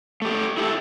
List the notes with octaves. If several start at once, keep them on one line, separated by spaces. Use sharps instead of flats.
A3 G4
E4 G4 A4